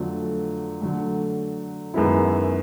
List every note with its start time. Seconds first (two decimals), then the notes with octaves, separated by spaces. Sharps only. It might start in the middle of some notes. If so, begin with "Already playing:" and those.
Already playing: F2 D3 F#3 A3
0.81 D3 F#3 A3
1.94 F#2 D#3 G#3 B3 E4